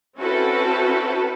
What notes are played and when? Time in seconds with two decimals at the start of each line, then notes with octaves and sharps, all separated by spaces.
0.18 C4 C#4 E4 F#4 A4 B4